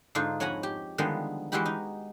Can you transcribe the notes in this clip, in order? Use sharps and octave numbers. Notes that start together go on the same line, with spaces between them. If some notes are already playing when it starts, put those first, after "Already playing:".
G#2 D3 D4 D#4 F4
F2 C#5 F#5 G#5 A#5 B5
G4
D3 D#3 F3 G3 G#3 B3
E3 G#3 E4 F#4 G4 B5
D#4